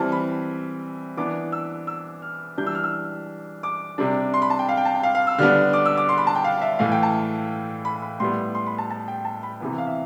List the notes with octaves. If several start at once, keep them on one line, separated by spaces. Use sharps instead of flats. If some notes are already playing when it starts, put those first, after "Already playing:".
Already playing: E3 G3 C4 A5 F6
B5
E3 B3 D4 D6
E6
E6
F6
E3 G3 D4 G6
E6
F6
E6
D6
C3 G3 D4
C6
B5
A5
G5
F5
G5
A5
G5
F5
F5
E6
D3 G3 B3 D4 F6
D6
E6
D6
C6
B5
A5
G5
F5
E5
A2 E3 A3 F5
G5
A5
B5
B5
A2 G3 B3 C6
C6
B5
A5
A5
G5
A5
B5
C3 E3 B3
F5
E5